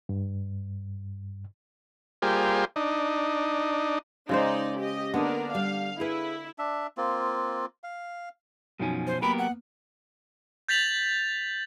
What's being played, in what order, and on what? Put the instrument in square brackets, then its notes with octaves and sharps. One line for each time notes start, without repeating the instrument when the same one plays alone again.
[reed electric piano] G2
[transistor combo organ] G3 A#3 F4 G4 G#4 C5
D4 D#4
[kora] C#3 G#3 C5 [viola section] D#4 D5
[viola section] G4 D#5
[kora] D3 D#5 [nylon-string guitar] A#3 B3 [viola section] D4 A#4
[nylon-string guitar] G3 [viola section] F5
[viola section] E4 [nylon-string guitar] G#4 B4
[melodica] D4 E5
A#3 C4 F4
F5
[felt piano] F#2 D#4 G#5 [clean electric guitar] B2 F3 C#4
[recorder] C5
[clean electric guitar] F#3 G4 A#4 [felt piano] A#3 B3 [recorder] B5
[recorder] F#5
[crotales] G6 A6 B6 F7 F#7